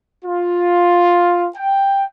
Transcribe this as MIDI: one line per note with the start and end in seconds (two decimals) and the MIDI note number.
0.25 1.48 65
1.56 2.04 79